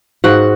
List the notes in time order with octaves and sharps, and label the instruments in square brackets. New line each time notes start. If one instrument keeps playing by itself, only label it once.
[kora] G#2 F#4 F#5